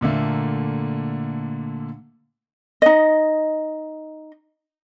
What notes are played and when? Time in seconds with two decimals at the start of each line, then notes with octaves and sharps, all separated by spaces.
0.01 A#2 D3 A3 A#3
2.82 D#4 D#5